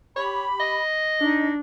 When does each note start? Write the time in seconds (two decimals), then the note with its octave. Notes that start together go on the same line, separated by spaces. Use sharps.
0.16 G4 C#5 B5
0.60 D#5
1.21 D4 D#4